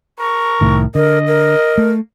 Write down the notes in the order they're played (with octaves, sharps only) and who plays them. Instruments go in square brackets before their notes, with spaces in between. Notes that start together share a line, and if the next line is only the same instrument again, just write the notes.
[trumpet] A#4 [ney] C#6
[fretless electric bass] C2 A2 D#3
[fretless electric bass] D3 [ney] A#4 [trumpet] D#5
[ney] A#4
[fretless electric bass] A3